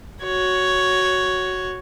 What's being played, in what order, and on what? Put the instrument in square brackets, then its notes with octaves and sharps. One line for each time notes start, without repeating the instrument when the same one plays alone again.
[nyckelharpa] F#4 C#5